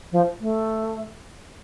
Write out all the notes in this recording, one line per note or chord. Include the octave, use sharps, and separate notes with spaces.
F3
A3